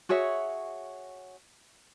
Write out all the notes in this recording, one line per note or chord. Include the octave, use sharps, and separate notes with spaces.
F#4 G#4 C#5 E5